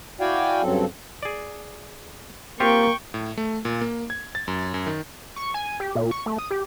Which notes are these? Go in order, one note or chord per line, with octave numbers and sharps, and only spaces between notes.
E4 F#4 D5 F5 G5 G#5
G2 C#3 F#3 C4 A4
G#4 D5
A#3 C4 F4 G4 G5 C#6
A2
A3
A#2
A#3
G#6
A6
F#2
F#2
D#3
C#6
G#5
G4
A#2
C#6
A3
D#6
G4